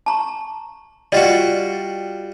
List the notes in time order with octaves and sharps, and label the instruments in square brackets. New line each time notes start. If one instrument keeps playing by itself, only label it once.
[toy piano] A5 A#5 C#6
[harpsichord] G3 F4 F#4 [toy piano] D5 D#5